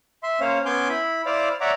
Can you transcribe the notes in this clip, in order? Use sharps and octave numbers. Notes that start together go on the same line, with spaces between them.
E5 C6
A#3 C#4 C5 C#5 F5
B3 C#4 G#5 C6 D6 G6
E4 B5
E4 C5 D5 F5 D6
C#5 D5 E5 F#5 A#5 D6